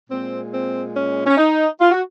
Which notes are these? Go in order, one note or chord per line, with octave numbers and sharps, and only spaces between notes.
A#2 G#3 C4
C4
C#4
C#4
D#4
F4
F#4